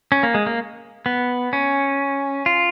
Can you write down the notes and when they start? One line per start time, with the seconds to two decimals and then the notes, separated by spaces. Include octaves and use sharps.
0.12 C#4
0.23 A#3
0.34 G#3
0.46 A#3
1.06 B3
1.53 C#4
2.46 F4